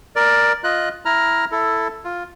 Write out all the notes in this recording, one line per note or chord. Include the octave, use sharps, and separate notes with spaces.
A#4 D5
F4 D#5 F#6
E4 A#5 F6
E4 A4
F4